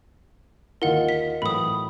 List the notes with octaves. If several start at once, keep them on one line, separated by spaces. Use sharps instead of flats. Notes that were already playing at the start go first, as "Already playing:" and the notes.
D#2 D#4 F4 A#4 F#5
B6
A2 E3 F#3 B5 D#6